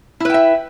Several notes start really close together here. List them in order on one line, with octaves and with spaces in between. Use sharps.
E4 B4 G5 E5